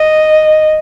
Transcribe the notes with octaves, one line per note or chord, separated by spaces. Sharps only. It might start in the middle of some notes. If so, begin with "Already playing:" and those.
Already playing: D#5